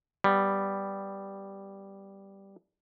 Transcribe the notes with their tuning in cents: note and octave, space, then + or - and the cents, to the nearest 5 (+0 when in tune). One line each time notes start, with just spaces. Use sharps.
G3 +0 B3 +0